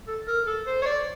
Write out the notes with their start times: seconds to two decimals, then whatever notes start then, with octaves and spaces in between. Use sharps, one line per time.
0.07 A4
0.27 A#4
0.47 A4
0.66 C5
0.82 C#5
0.86 D5